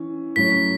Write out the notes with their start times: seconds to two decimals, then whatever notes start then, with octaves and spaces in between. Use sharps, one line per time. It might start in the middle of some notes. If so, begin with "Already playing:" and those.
Already playing: E3 C#4
0.36 A2 F#3 C#4 B6